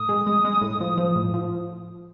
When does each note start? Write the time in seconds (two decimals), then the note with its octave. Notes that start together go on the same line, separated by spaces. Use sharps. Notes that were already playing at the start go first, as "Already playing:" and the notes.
Already playing: A2 D#6
0.09 G#3
0.27 G#3
0.44 G#3
0.61 A2
0.80 F3
0.97 F3
1.15 A2
1.34 F3